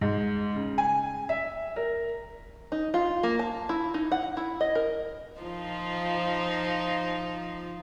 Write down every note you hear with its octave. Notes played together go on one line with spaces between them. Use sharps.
G#2
C#3
G#5
E5
A#4
D#4
F4
A#3
A5
E4
D#4
F#5
E4
D#5
A#4
F3 D#4 F4